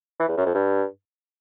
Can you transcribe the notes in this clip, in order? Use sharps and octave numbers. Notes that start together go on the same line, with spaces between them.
E3
E2
F#2
F2
G2